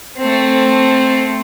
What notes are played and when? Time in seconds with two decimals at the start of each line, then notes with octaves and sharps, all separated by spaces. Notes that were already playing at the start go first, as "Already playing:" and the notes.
0.18 A3 C4